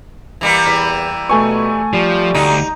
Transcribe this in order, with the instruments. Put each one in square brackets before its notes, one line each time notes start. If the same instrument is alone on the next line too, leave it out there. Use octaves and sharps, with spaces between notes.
[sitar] E3 G3 A#3
[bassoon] E2 [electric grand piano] B6
[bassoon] B2 [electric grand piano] A3 G#5 C#6
[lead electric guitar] F3 [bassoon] G3
[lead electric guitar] D2 [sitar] D#4